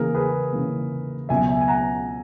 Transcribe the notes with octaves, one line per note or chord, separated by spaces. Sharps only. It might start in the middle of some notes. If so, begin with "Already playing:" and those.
Already playing: C#3 E3 A#3 G#4 A#4
G#4 B4
C#3 E3 A#3
C#2 B2 F#3 E5 G#5
E5 G#5
G#5
F#5 A#5